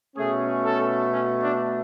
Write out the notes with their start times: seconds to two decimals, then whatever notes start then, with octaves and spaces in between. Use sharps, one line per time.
0.15 B2 A3 C#4 G#4
0.63 A4
1.10 C#4
1.41 D4